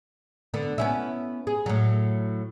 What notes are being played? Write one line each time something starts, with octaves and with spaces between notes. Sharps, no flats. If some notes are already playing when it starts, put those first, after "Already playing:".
D3 B3
B3 C#4 E4
G#4
A2 F#3